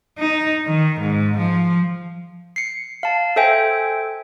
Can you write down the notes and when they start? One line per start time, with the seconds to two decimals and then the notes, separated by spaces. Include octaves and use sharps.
0.19 D#4
0.66 D#3
1.00 G#2
1.37 F3
2.56 C7 C#7
3.03 F5 A5
3.36 A4 C5 E5 G5 G#5